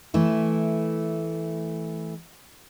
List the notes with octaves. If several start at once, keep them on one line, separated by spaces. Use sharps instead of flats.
E3 A3 E4